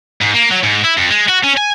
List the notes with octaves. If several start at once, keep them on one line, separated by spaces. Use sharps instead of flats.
G#2
A#3
F#3
G#2
E4
F2
G#3
F#4
C#4
G#5